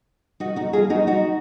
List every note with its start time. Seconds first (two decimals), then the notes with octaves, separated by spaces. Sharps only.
0.40 D#4 F#4
0.56 D#4 F#4
0.73 F4 G#4
0.90 D#4 F#4
1.07 D#4 F#4